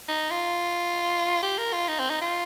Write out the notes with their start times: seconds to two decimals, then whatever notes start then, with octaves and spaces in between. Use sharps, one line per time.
0.08 D#4
0.30 F4
1.42 G4
1.58 A#4
1.73 F4
1.88 D#4
2.00 C4
2.10 D#4
2.21 F4